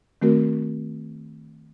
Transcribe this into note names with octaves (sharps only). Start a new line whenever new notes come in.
D#3 A3 C4 F#4 A#4